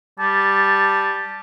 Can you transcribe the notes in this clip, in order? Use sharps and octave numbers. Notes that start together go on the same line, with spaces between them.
G3 A5